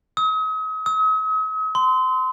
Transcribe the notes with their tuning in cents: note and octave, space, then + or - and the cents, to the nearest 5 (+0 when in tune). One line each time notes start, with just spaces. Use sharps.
D#6 +40
D#6 +45
C6 -25